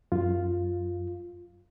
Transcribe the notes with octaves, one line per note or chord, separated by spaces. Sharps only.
F#2 F4